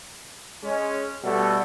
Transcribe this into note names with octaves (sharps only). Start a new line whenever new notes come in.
G#3 C#4
B2 G3 A3 A4